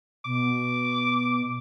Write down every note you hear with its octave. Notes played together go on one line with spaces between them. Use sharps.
B2 D6